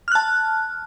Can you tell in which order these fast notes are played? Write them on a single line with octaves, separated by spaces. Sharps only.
F6 F#6 A5